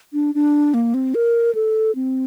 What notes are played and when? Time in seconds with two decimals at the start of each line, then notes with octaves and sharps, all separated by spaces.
0.13 D4
0.35 D4
0.74 A#3
0.94 C4
1.15 A#4
1.55 A4
1.95 C4